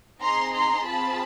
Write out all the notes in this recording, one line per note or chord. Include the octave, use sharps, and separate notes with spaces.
C4 D#4 G#4 A#5 C6
A#5 C6
C4 F4 G#4 A5 B5